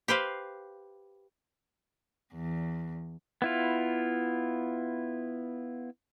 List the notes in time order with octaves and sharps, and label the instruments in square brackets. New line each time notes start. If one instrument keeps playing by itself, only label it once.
[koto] G4 B4 C5 F5
[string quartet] E2
[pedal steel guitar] B3 E4 F4